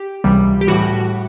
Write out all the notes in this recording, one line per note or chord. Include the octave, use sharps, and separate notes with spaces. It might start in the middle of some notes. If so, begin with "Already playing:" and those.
Already playing: G4
C#2 C3 E3 G3
G4
A2 E3 G3 F#4